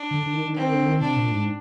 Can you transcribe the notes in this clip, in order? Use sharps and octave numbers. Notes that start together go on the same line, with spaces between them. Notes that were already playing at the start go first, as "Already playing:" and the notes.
Already playing: D4
D3
D3
D#3
D#3
D#3 C4
D3
D#3
C3 D4
A#2
G#2